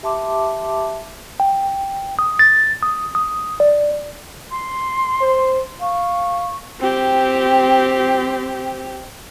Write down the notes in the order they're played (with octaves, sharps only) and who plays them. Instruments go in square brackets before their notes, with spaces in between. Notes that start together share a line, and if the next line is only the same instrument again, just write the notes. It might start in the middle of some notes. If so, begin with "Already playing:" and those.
[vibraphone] G4 E5 A5 C6 D6
[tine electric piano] G5
D#6
A6
D#6
D#6
D5
[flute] C6
[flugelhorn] C5
[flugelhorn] F5 [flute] C#6
[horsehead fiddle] C4 G4